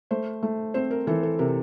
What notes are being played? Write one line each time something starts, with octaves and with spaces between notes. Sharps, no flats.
A3 C5
A3
C4 C5
A#4
E3 A4
A4
C3 A#4